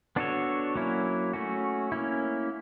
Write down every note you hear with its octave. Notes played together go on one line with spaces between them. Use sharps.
B3 D4 F#4 A4 C#5
F#3 A#3 C#4 E4
A3 C#4 F#4
A#3 C#4 E4